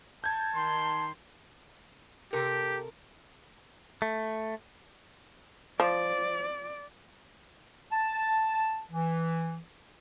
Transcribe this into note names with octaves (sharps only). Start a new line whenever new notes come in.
A5 G6 G#6
D#3 C6
C3 G4 A4 A#4
A3
F3 D5
A5
E3